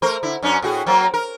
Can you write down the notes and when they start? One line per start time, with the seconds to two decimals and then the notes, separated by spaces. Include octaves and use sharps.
0.02 A3 A#4 C5
0.23 D3 E4
0.43 F#2 C#4 D4
0.62 A2 F#4 G#4
0.86 F#3 A#3 C4
1.14 A#4